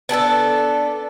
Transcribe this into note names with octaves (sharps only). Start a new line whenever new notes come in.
B3 D4 G#4 A4